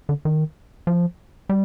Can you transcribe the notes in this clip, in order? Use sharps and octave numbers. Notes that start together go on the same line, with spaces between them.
D3
D#3
F3
G3